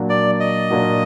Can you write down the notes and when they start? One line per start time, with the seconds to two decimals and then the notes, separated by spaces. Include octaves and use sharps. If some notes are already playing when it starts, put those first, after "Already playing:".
Already playing: A#2 F#3 A#3 D4 F#4
0.10 D5
0.40 D#5
0.71 A#2 F#3 A#3 D4 F#4